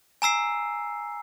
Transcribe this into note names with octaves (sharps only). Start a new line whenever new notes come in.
G#5 A#5 E6 C7